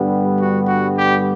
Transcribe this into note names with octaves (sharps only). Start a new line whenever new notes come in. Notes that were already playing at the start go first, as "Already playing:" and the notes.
Already playing: G2 D3 G3 B3
F#4
F#4
G4